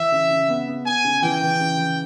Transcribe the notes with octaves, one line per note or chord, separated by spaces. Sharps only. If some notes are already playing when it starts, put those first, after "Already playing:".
Already playing: E3 E5
C#3
C#3
B3
B3
B3 G#5
C#3
E3 G5
E3
C#3
E3